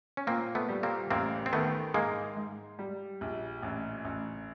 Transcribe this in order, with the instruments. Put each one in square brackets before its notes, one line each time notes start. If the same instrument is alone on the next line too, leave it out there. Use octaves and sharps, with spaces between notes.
[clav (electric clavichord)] C#4
[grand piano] A#2 [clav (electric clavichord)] A#3 C4
[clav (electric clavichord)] A3 B3
[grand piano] G3
[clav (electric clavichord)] A#3 C4
[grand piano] A1 [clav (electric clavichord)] A#3 C4
[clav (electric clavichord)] C4
[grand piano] D#3 [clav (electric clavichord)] A3 B3
[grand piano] G#2 [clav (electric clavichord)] G#3 A#3
[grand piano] G#2
G3
A#1
A1
A1